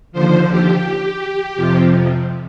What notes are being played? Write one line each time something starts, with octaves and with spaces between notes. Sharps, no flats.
D#2 D3 F3 C5
G4
F2 C3 F3